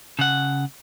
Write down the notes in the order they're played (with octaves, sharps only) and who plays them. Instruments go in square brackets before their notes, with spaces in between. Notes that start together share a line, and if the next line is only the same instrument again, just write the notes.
[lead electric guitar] C#3 F#5